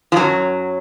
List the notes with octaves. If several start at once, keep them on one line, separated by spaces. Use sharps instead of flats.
F3
F#2 F#3